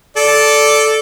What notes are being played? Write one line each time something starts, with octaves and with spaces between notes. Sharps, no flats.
A4 D5